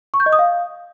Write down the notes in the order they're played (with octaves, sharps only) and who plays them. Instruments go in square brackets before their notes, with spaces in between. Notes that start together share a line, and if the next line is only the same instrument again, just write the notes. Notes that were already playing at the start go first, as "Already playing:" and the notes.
[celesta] C#6
G6
D#5
D#6
F5